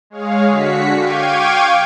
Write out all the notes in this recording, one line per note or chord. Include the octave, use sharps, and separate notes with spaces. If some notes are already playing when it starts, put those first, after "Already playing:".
G#3 G#4 C#5 F5
D3 F#4 B6 C#7
F5 G5 C#6 D6 G#6 D#7